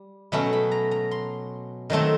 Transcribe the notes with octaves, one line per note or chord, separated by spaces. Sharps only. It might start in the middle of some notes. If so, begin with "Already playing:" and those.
Already playing: G3
B2 F#3 A3 C#4 B5
B5
A#5
A#5
C6
D#3 F#3 A3 C4